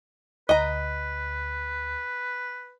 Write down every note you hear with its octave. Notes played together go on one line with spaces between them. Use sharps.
D2 B4 D#5 A#5